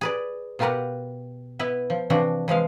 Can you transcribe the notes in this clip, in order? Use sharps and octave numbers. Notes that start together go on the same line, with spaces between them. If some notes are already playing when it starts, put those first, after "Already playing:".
G#4 B4 D5
B2 F4 G4 A#4 B4 F#5
B3 E4 B4
F3
C3 E3 F3 D4 F#4
E3 F3 G#3 F5